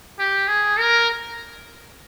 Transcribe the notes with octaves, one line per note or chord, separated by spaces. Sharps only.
G4
G#4
A#4